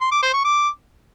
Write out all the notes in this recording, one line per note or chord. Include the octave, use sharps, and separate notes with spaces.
C6
D6
C5
C#6
D6